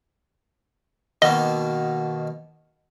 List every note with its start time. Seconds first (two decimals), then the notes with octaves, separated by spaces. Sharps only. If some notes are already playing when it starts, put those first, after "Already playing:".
1.22 B2 D#3 A#3 D#5